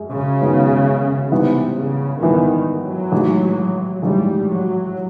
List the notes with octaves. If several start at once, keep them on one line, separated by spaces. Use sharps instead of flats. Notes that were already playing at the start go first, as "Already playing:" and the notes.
Already playing: F#2 G#3
C#3
F#2 D#3 G#3 B3
G#2 C3 E3 G3 B3
C#3
G#2 D#3 E3 G3 B3
F#3
A1 G#2 D#3 G#3
A1 G#2 D#3 G3 G#3
F#3